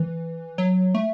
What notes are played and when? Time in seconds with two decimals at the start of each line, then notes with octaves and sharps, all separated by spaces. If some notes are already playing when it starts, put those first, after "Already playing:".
Already playing: E3
0.58 F#3
0.95 A3